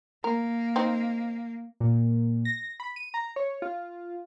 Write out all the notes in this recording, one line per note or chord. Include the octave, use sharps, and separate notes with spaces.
A#3 A#4
C4 D#4
A#2
A#6
B5
D#7
A#5
C#5
F4